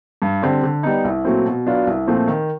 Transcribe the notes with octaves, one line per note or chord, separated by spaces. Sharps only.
G2
D3 G3 C4
D3
G3 B3 D#4
C2
A#2 F#3 A3 C4
B2
F#3 B3 D4 F4
C2
A#2 F3 A3 C4
D#3